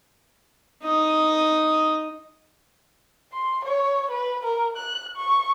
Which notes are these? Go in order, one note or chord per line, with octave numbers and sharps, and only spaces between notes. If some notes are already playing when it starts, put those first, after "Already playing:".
D#4 D#5
C6
C#5
B4
A#4
F#6
C#6